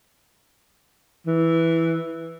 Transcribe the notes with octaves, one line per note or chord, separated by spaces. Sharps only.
E3